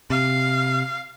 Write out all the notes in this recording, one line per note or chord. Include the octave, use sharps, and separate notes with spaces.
C3 F5